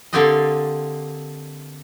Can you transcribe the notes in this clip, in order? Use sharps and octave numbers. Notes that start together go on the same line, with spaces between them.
D3 A#3 C4 G4 D5 D#5